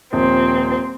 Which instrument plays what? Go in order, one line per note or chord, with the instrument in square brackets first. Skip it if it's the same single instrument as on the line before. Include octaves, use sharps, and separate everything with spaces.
[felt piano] D#1 F3 [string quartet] C4